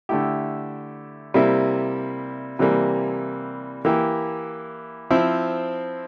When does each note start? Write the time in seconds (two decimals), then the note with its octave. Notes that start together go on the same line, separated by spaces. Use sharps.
0.09 D3 A3 E4 G4
1.34 C3 G3 A#3 E4
2.59 C3 E3 G3 A#3
3.85 E3 A#3 E4 G4
5.10 F3 C4 E4